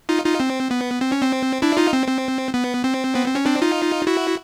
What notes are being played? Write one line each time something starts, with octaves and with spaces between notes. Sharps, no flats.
D#4 F4
D#4 F4
C4
B3
C4
C#4
C4
D4 E4
D#4 F4
C4
C4
B3
C4
B3
C4
C#4
C4 D4
D#4 F4
E4 F#4